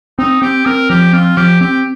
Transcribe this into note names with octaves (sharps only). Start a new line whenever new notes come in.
C4 D#4
C4 G4
C4 A#4
F3 G4
C4 F4
F3 G4
C4 G4